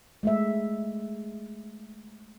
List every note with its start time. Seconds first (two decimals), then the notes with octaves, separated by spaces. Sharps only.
0.23 G#3 A3 E5